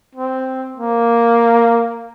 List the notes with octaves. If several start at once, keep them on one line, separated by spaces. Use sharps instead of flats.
C4
A#3